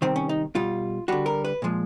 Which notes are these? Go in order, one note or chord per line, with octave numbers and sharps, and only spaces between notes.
C3 D#3 G3 C4
C#4
D#4
B2 G3 F4
D3 G3 F#4
A#4
B4
A#2 F3 G#3